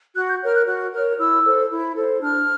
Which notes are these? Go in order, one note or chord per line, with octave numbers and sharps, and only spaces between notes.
F#4 F#6
G6
A#4 C#5 F6
F#6
F#4 F#6
A#4 C#5 F6
E4 E6
A4 C5
E4
A4 C5
D4 F6